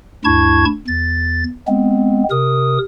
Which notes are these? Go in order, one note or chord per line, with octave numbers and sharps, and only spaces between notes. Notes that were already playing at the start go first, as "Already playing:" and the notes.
D2 G2 E4 A5 C#6 G#6
E2 A6
G#3 B3 C4
C3 A#4 D#6